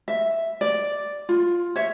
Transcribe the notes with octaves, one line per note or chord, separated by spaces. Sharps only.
E5
D5
F4
C#5 E5